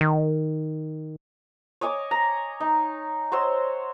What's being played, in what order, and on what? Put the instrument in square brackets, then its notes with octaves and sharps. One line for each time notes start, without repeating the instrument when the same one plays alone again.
[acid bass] D#3
[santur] C#5 D#5 G#5 D6
A#5
D#4
F#4 C5 C#5 E6